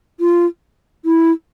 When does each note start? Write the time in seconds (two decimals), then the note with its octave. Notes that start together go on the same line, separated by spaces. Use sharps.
0.20 F4
1.05 E4